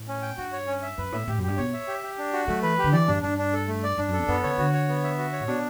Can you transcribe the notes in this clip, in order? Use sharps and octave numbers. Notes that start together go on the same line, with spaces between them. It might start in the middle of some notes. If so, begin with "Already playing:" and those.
Already playing: A2
C#4
G5
G2 F#4
C#5
C#4
E5
F#2 B4
A2 E5
A2 G4
F#2
G2 G4
B2 C#5
E5
G4
G4
D4
F#4
F#3 A3
E3 B4
G4
D3
E3 D5
G2 D4
G2 D4
D4
A4
A3
D5
G2 D4
F#2 A4
E2
F#2 B3
C#3 C#5
D3 F#4
C#5
B3
E5
F#4
C#5
A2
B2 D4